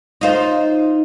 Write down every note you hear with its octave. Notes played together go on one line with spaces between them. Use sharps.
D#4 F4 C5